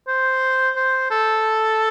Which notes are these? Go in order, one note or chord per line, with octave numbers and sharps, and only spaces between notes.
C5
C5
A4